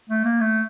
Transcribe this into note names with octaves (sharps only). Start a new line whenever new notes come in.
A3
A#3
A3